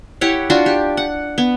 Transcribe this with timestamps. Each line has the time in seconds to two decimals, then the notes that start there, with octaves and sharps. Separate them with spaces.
0.21 E4 G4 C#5 F#5
0.50 D4 F4 F#4
0.66 G4
0.97 F#5
1.38 B3